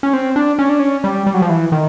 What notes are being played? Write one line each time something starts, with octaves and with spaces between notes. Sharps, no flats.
C#4
C4
D4
C#4
D4
C#4
G3
G3
F#3
F3
E3
D#3